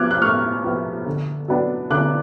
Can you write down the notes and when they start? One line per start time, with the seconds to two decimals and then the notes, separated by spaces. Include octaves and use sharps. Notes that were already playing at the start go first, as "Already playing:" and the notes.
Already playing: F3 B3 D6 F6 F#6 G#6
0.11 F#6
0.22 A2 C#6 F6
0.64 F3 B3
1.06 D3
1.48 F#3 B3 D4
1.90 D3 D6 F#6